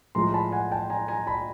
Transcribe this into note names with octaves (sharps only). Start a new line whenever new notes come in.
A2 F3 G#3 A#5 C6
A5 B5
F#5 G#5
G5 A5
G#5 A#5
G#5 A#5
A5 B5